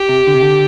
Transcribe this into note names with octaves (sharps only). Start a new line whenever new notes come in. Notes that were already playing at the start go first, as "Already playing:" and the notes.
Already playing: G4
C3
D3
C3
D3